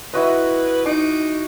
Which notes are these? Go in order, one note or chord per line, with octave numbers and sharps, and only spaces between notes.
E4 F#4 B4 D#5
D#4 D6